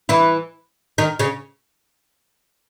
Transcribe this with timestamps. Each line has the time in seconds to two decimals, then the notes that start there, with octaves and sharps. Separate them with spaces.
0.09 E3 E4
0.98 D#3 D#4
1.19 C#3 C#4